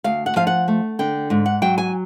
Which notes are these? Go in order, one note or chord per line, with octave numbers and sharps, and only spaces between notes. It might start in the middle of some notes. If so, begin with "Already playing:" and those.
D2 F5
F#5
F3 F5
F#5
A3
D3 G5
G#2
F#5
F#3 G5
G#5